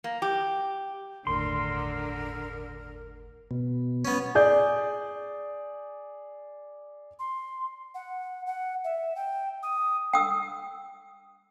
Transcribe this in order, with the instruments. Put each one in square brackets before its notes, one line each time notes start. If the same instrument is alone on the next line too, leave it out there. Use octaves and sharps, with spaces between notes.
[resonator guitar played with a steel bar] A#3
G4
[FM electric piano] G1 D#2 A2 [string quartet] D3 [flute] A#4 [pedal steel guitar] C6
[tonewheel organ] B2
[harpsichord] B3 C#4
[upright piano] G#4 D5 G6
[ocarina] C6
F#5
F#5
E5
G5
D#6
[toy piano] G5 D#6 E6